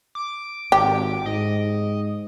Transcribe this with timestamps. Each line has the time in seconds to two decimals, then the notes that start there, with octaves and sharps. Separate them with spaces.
0.15 D6
0.72 G#1 G4
1.26 G#2 D#5